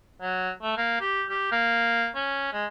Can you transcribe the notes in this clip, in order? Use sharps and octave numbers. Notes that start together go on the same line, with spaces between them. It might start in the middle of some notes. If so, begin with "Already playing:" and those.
F#3
A3
A#3
G4
G4
A#3
C#4
G#3